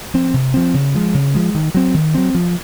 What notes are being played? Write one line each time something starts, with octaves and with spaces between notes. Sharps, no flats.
F3 C4
C3
F3 C4
C#3
F3 G#3
C#3
F3 G#3
D#3
F#3 C4
D#3
F#3 C4
F3